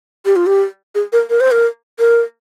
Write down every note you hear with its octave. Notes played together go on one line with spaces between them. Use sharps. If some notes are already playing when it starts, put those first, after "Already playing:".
G4
F4
G4
G#4
A#4
A#4
C5
A#4
A#4